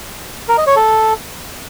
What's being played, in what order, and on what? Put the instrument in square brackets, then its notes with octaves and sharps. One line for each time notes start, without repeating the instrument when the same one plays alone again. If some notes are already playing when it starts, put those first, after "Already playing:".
[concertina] A#4
D#5
C#5
A4